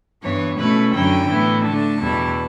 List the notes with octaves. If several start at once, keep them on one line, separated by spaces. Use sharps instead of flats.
G2 E3 B3 C#5
B2 A3 C#4 E4 B4
F#2 D3 F#3 C#4 E4 G5
A2 E3 B3 E4
D3 A3 D4 A5
E2 B2 G3 B3 E4